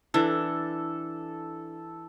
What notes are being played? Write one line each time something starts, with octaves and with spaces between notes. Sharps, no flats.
E3 D4 A4